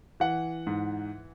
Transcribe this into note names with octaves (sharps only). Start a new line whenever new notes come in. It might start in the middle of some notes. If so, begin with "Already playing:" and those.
E3 F#5
G#2